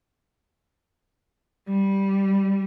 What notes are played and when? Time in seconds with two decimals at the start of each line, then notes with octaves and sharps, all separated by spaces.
1.69 G3